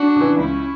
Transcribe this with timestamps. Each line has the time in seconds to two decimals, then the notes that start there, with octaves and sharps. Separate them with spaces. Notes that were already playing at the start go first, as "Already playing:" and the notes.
Already playing: D4 F#4
0.16 C#3 E3
0.38 C#2 C#4 E4